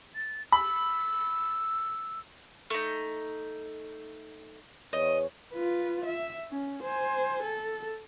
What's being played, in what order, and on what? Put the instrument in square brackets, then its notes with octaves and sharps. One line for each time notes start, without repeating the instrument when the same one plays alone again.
[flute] A6
[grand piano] B5 [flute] E6
[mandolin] A3 D#4
[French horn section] E2 C#5 [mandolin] D#5
[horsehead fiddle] F4 B4
E5
C#4
C5 G#5
A4